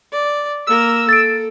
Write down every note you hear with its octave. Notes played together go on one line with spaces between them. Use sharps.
D5
A#3 A#4 E6
A4 A6 D7